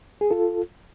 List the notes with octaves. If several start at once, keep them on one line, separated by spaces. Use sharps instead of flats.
G#4
F4 A4